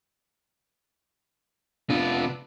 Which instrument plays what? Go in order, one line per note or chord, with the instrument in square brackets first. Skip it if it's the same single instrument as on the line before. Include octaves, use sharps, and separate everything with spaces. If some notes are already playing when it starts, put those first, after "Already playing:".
[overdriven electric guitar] C3 F4 [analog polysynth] B3 D4